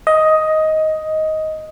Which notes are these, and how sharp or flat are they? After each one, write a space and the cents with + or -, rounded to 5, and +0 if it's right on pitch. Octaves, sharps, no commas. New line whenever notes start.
D#5 +10